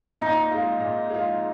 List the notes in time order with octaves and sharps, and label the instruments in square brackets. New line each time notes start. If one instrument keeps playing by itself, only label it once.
[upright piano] A#2 [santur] D#4
[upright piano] G#3 F4
A#2
G#3 F4